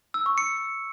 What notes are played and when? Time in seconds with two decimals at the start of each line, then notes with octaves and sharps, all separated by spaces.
0.14 E6
0.26 C#6
0.38 C#7